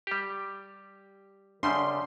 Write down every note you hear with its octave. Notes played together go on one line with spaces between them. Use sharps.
G3 G4
F#2 C#3 G3 D4 C6